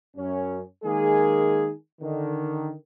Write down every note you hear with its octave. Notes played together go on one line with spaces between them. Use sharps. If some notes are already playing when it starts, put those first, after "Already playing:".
F#2 C#4
D#3 G#3 A#3 G#4
D3 D#3